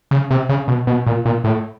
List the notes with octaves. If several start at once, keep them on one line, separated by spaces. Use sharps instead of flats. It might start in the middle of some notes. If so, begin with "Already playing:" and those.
C#3
C3
C#3
B2
B2
A#2
A#2
A2